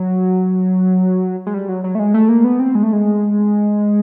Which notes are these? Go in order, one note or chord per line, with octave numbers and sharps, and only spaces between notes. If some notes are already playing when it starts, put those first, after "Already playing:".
Already playing: F#3
G#3
G3
F#3
F#3
A3
G#3
A3
A#3
B3
C4
G#3
A3
G#3